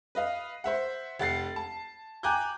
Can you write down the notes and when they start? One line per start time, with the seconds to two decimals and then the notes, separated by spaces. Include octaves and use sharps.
0.15 B4 D#5 F5
0.64 C5 E5 F#5
1.19 F1 F#5 A6 C7
1.56 A5
2.23 G5 G#5 A#5 D6 F#6 G6